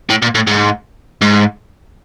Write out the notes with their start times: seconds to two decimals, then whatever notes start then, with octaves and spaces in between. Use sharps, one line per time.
0.10 A2
0.22 A#2
0.35 A2
0.47 G#2
1.22 G#2